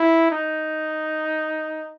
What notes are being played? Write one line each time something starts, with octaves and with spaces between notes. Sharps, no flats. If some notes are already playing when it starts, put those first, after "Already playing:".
Already playing: E4
D#4